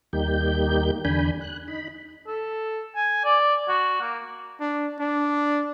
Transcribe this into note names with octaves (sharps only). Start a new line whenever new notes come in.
D#2 G3 A#3 D#4 G4 G6
E2 D3 D4 G#5 B5 G6
F#6
D#4 B5
A4
G#5
D5
F#4
A#3
D4
D4